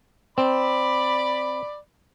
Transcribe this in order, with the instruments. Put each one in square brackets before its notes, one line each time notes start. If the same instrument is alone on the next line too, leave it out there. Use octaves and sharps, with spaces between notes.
[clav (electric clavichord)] C4 [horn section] D5 B5